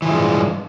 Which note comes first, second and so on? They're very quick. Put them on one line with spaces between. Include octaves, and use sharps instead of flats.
E3 F3 G#3 G2